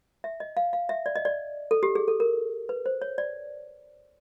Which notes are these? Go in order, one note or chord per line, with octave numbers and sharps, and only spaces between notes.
E5
D#5
F5
F5
E5
D5
D#5
D5
A4
G4
G#4
A4
A#4
B4
C5
C#5
D5